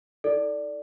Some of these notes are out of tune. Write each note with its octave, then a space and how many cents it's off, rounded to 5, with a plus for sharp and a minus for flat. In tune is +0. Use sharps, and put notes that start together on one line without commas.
D#4 +45 A4 +0 D5 +0